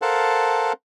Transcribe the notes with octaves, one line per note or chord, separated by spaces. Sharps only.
A4 A#4 C5 F5 F#5 A5